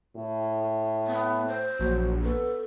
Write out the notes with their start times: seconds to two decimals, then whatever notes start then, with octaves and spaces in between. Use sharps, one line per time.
0.16 A2
1.07 B3
1.47 C5
1.79 A#1 F#3
2.23 B3 A4